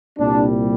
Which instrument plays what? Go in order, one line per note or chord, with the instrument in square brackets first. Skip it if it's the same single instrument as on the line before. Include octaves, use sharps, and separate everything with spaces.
[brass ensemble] C2 A#2 G3 D4